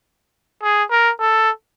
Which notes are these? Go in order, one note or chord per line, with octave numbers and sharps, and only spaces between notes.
G#4
A#4
A4